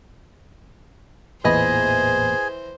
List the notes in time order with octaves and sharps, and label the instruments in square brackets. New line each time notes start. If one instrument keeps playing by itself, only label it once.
[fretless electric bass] A1 E2 A#2 [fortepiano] E3 D#5 B5 [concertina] G#4 [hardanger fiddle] C5